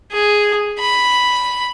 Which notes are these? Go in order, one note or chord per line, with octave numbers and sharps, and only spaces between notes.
G#4
B5